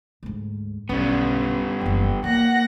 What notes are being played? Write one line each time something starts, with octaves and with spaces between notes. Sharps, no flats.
D2 G#2
B1 D3 G3 B3 C#4
F#1 E2 G5
A#3 E4 F4 F#5 A#6